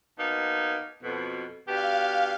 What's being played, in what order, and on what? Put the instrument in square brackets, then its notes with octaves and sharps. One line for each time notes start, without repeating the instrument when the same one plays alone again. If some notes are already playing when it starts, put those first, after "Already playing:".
[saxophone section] B2 A#3 D#4
F2 B2
[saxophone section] B2 D4 G4 [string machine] F5